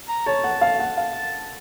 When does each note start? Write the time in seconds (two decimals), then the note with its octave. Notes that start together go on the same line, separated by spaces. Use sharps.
0.09 A#5
0.26 C#5 A5
0.44 F#5
0.61 F5
0.79 F#5
0.97 F5